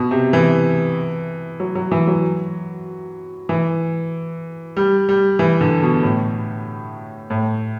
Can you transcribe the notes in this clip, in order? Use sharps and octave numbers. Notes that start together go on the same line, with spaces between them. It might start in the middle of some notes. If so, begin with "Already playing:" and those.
Already playing: B2
C3
E3
F#3
F#3
E3
F#3
E3
G3
G3
E3
D3
B2
A2
A2